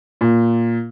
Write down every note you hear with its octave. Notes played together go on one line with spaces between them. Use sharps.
A#2